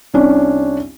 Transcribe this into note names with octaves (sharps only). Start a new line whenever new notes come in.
C2 C#4 D4